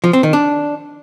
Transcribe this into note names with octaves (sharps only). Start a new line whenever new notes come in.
F3
C4
D#3
D4